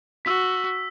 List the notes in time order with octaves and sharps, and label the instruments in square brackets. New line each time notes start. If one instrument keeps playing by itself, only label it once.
[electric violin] F#4 [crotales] E6 B6